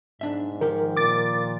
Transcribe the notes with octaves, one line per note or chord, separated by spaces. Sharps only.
B1 G#2 D4 E5
D#3 F3 G4 A#4
A#2 D6 A6